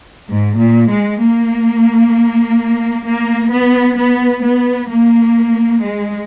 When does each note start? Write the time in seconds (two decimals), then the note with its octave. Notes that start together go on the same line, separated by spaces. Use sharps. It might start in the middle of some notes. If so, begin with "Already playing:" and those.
0.28 G#2
0.57 A#2
0.89 G#3
1.20 A#3
3.05 A#3
3.50 B3
3.97 B3
4.42 B3
4.89 A#3
5.81 G#3